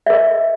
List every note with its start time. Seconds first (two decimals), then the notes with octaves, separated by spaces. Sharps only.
0.06 E5
0.10 A#4
0.14 D#5